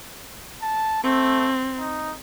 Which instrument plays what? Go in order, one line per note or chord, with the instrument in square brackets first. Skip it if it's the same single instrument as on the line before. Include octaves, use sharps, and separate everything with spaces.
[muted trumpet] A5
[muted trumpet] A3 [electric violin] C4
[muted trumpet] D#4